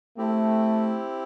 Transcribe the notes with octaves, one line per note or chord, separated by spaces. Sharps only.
A3 C4 E4 G4